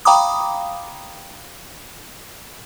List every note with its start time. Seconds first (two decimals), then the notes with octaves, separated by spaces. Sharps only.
0.05 F5 G5 A#5 B5 D6 D#6